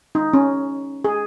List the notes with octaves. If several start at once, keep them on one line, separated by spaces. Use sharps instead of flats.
D#4
C#4
G#4